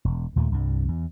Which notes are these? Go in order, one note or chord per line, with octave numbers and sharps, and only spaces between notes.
E1
D#2 A#2 A3 A#3
C2 G2
E2